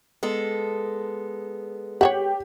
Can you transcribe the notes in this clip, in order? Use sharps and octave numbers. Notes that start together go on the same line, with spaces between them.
G#3 B3 A4
G4 C#5 E5 F#5